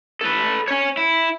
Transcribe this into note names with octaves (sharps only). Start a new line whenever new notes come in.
A4 B4
C#5 G#5
E4